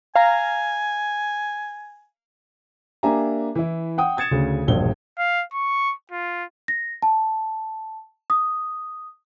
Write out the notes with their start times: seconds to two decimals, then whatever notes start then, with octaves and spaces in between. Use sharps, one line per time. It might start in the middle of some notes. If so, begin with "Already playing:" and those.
0.16 F5 G#5 A#5
3.03 A#3 D4 G4 E5 G#5 A#5
3.55 E3 E4
3.98 F#5 G5 D#6
4.17 D#6 G#6 A6 C#7 E7
4.31 D2 C#3
4.67 E1 A#1 G2 G7
5.19 F5
5.54 C#6
6.12 F4
6.68 A#6
7.03 A5
8.30 D#6